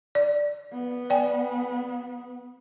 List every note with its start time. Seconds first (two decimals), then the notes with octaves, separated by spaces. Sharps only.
0.15 D5
0.73 B3
1.10 D5 G5 G#5